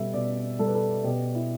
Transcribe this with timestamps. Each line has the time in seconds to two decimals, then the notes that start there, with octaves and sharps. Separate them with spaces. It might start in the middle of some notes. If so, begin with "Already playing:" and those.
Already playing: B2 G3 A4 E5
0.14 B2 D5
0.59 G3 A4
0.66 B4
0.74 A4
1.04 B2 G4
1.35 E4